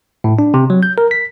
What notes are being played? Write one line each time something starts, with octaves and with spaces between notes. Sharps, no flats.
A2
D4
C3
F#3
G6
A#4
B6